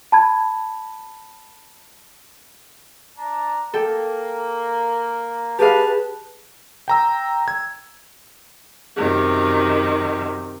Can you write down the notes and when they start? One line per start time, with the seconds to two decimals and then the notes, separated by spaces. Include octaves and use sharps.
0.12 A5 B5 G#6
3.18 D4 A5 A#5
3.74 A#3 A4 G5
5.59 G4 G#4 B4 F5 A5
6.88 G5 A#5 E6
7.48 G#6
8.96 F#2 C3 D#3